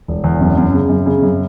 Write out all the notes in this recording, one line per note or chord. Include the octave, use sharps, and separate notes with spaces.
E1
E2
F#2
F#2
C#3
F#2
C#3
F#2